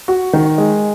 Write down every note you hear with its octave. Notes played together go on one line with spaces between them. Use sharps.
F#4
D#3
G#3